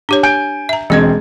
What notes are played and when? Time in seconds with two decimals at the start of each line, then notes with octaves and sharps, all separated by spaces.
0.09 D4 G4 C#5
0.23 G#5 G6 D7
0.69 E5 A#5
0.90 E1 G#3 C4 D#5 G#6